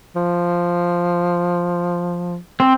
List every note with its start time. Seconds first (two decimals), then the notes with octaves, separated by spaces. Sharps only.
0.16 F3
2.60 C4